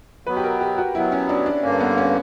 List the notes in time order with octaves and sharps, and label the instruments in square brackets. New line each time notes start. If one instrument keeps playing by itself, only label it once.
[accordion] B2 F#3 B3 [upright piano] B4
[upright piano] G4
A#4
G4
F#4
[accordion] B2 F#3 B3 [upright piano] E4
[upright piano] C#4
D4
D4
[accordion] G2 D3 A#3 [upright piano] C#4
[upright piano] B3
C#4